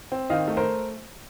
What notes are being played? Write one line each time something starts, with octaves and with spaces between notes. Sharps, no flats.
C4
D#3 D#5 F5
A3
A#4 C5